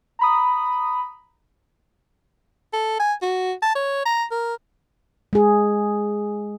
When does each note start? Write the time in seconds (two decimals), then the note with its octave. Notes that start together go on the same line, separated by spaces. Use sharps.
0.19 A#5 B5 D#6
2.73 A4
2.99 G#5
3.22 F#4
3.62 A5
3.75 C#5
4.05 A#5
4.31 A#4
5.33 G#3 G#4